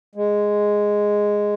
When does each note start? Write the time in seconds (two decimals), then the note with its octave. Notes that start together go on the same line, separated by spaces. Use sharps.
0.15 G#3